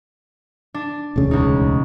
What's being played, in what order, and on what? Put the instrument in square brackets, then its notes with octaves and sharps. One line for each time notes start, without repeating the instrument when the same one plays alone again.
[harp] D4
[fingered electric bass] E1 D2 C#3
[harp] C#2 D#4